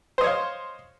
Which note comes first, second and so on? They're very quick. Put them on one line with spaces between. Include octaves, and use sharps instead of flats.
C5 D#5 C#5 F5